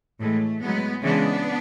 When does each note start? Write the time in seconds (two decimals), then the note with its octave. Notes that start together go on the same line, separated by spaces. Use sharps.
0.20 A2 E3 G#3 A3
0.61 A2 F#3 G#3 B3
1.03 C#3 E3 G#3 B3 D4